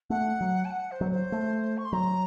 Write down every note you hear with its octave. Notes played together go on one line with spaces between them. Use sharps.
A3 F#5
F#3
A5
F#5
C5
F#3
C5
A3
C#6
C6
F#3 A#5